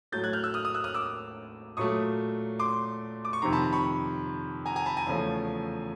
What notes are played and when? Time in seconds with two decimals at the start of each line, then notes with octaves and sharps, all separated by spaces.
0.12 A2 F#3 A3 G6 A6
0.24 F#6 G#6
0.33 F6 G6
0.44 E6 F#6
0.54 D#6 F6
0.65 D#6 F6
0.74 E6 F#6
0.84 D#6 F6
0.94 D6 E6
1.77 A#2 F#3 A3 C#6 D#6
2.59 C6 D6
3.25 D6
3.33 C#6
3.42 F2 C3 D#3 A#5 C6
3.53 A5 B5
3.72 B5 C#6
4.66 G#5 A#5
4.76 G#5 A#5
4.86 A5 B5
4.97 G#5 A#5
5.07 E2 C#3 F3 A3